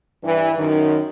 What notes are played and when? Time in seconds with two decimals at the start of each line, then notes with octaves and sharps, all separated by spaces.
0.23 G2 E3
0.56 F#2 D#3